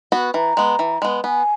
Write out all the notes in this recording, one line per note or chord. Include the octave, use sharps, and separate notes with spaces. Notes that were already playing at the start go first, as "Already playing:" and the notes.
B3 F#4
E3 A#5
G#3 B3
E3
G#3 B3
B3 G#5